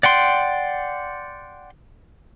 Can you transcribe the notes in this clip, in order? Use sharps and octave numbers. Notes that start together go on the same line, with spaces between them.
D5 F#5 G5 C6